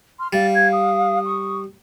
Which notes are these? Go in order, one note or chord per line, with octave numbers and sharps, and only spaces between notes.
C6 F6
G3 F5 A6
G#6
D#6
C#6